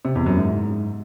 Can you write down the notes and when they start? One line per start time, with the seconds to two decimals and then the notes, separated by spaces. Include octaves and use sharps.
0.05 C3
0.15 E2
0.26 F#2
0.37 G#2